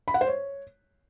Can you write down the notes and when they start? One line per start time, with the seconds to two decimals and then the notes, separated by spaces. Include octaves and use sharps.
0.08 B5
0.14 F#5
0.21 C5
0.28 C#5